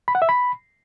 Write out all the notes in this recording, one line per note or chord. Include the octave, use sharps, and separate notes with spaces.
B5
F#5
E5
B5